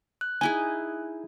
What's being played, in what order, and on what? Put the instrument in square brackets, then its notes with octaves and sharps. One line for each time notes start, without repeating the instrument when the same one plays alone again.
[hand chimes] F#6
[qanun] D#4 E4 G#4 [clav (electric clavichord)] G#5